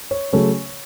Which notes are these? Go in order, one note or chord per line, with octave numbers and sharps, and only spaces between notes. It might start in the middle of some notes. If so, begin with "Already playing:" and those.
C#5
C#3 F#3 A3 C#4 C#5